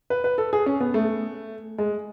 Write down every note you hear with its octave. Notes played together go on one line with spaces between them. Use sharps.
B4
B4
A4
G#4
C#4
B3
A3
G#3